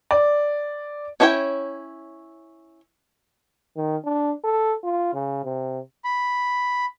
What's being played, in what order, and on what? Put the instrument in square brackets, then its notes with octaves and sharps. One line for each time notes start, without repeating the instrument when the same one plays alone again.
[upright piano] D5
[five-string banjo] C#4 D4 E4 C#5 G5
[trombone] D#3
D4
A4
F4
C#3
C3
[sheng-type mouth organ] B5